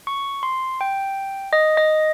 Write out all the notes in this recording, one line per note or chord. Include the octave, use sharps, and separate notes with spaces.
C#6
C6
G5
D#5
D#5